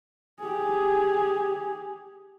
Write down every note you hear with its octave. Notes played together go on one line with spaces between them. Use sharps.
G4 G#4